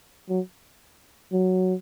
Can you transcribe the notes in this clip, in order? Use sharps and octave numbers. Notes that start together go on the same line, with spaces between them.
F#3
F#3